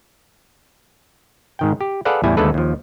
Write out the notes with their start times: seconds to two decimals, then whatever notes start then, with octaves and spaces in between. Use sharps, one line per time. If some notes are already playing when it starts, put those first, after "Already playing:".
1.59 G#2 D#3 G5
1.81 G4
2.05 G#4 A4 B4 D5 F5 F#5
2.24 E2 A2 G3 E4 G#5
2.37 D#2 D3 G#3 A3 A4 B4
2.54 D#2 F3